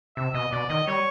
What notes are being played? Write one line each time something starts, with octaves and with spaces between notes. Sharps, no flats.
C3 E5
B2 D#5
B2 D5
D#3 D#5
G3 C#5